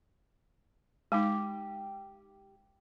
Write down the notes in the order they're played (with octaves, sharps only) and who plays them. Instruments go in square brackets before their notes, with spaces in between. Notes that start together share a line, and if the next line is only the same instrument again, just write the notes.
[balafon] G#3 D#4 [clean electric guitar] G4